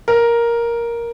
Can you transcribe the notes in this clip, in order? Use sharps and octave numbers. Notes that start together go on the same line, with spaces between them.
A#4